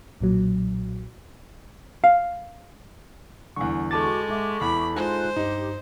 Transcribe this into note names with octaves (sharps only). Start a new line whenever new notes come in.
B1 A#2 F#3
F5
E2 D3 G3 G#5 C#6
G#3 F#4 A4 A5 C#6 D6 A6
G#2 E5 C#6 D6
E2 B5
G#3 D#4 F4 C5 G#5 F#6
G2 D#4 G4